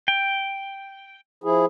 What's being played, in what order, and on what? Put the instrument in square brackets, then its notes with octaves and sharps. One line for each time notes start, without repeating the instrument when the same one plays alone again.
[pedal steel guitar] G5
[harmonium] F3 E4 G#4